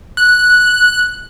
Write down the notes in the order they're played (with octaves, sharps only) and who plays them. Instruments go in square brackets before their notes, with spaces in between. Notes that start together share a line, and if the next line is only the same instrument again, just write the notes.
[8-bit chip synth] F#6